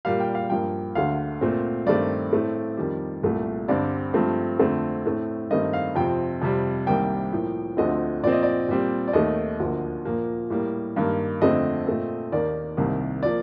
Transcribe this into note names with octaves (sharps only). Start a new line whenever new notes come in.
A#2 G3 A#3 F5
G5
F5
G2 F3 A#3 G5
D2 D3 A3 F5
A#2 A3 C4
G2 D#3 A3 C4 D5
A2 A3 C4
F2 D#3 G3
C2 A#2 A3
G2 D3 G3 C4 D5
G2 F3 A3 C4
F2 D3 A3 C4
A2 A3 C4
G2 D#3 A3 C4 D#5
F5
F2 C3 F3 C4 G5
F2 C3 G3
C2 C3 D#3 G3 A#3 G5
A2 F3 A#3
D2 D3 F3 A3 C4 D#5
A#2 F3 C4 D5
D#5
D5
A#2 G3 C4
D5
D#2 D#3 A3 D#5
D2 D3 F3 A#3
A#2 F3 A#3
A2 G3 A#3
G2 D#3 A#3
F2 D3 A3 C4 D#5
A#2 A3 C4
D#2 D#3 A#3 D5
C2 C3 D#3 A#3
F3 A#3 D5